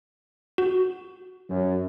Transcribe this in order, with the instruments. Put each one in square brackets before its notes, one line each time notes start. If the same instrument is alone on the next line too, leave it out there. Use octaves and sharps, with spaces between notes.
[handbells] F#4
[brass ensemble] F#2